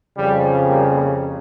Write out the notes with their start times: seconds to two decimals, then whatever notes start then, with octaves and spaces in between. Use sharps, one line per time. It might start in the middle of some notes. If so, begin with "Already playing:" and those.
0.17 F2 C#3 F3 G3
0.67 G3 A#3